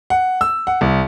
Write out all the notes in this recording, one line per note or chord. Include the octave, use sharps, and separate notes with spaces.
F#5
E6
F#5
C2